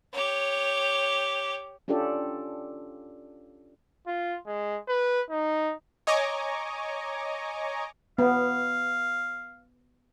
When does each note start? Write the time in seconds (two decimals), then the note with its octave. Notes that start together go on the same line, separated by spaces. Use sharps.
0.12 G4 C#5
1.88 C#4 D4 F4 G4 A4 D5
4.07 F4
4.47 G#3
4.88 B4
5.30 D#4
6.07 C#5 D#5 G#5 A#5 C#6 D6
8.18 B3 F5